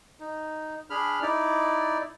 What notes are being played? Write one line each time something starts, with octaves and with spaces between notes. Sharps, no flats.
D#4
D4 G#4 B5 F6
D#4 E4 D5